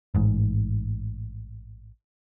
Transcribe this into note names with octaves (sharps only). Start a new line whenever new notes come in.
A1 G#2